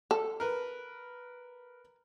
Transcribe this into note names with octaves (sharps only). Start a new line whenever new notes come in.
A4
A#4 B4